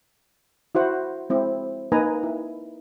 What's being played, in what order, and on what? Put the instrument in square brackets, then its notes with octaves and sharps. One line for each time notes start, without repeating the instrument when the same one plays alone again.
[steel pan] E4 F#4 C5 F#5
G#3 C4 E4
A#3 D#4 B4 G#5 A#5
E4